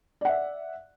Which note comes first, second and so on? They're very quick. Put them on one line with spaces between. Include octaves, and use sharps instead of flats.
D5 F#5 E5